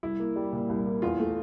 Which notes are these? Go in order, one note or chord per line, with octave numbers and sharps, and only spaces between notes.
C2 E4
A#3
G3
A#2
C2
A#3
E2 F4
A3